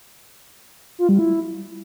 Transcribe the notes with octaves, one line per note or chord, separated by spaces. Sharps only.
F4
G3
E4